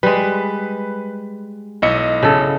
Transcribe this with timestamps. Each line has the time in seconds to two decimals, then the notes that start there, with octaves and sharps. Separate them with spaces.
0.03 G3 G#3 B4
1.82 B1 E4 D#5 C#7
2.23 C#3 A4